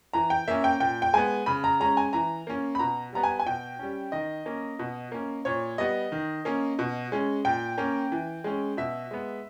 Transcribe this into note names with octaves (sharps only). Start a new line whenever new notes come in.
E3 A#5
G5
A#3 C#4 E5
G5
A#2 G5
G5
G#3 B3 G#5
C#3 B5
A#5
G#3 C#4 A#5
G#5
E3 A#5
A#3 C#4
B5
B2 A#5
G3 B3 A#5
G#5
G#5
B2 G5
G3 C#4
D#3 D#5
A#3 C#4
B2
A#3 C#4
A#2 C#5
G3 B3 D#5
D#3
A#3 C#4
B2
G#3 C#4
A#2 G5
A#3 C#4
E3
G#3 C#4
B2 E5
G#3 B3